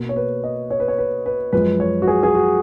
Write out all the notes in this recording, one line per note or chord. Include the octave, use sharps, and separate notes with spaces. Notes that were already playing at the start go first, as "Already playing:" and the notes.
Already playing: B2 A#3
C#5
B4
D#5
C#5
B4
C#5
B4
B4
F#2 F3 G#3 B4
C#5
F#4
G#4
G#4
F#4